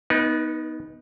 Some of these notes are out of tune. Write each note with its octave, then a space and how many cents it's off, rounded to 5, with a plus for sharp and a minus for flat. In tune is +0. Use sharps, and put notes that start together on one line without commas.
B3 +0 D#4 +10 B4 -45